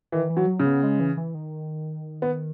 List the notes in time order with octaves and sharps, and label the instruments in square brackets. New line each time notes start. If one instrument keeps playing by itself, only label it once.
[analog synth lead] D#3 [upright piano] E3
[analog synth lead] E3
[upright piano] F#3
[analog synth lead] F#3
[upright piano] C#3
[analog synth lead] B3
G#3
E3
E3
D#3
[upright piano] B3